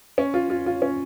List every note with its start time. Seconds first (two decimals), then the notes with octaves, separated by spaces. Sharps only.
0.18 C#4
0.34 F4
0.50 F4
0.66 F4
0.82 C#4